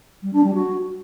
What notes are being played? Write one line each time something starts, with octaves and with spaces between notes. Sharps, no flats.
G3
D4
G3
F#4